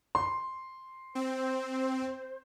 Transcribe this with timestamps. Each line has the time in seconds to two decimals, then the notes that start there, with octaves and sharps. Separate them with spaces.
0.15 C6
1.15 C4 C5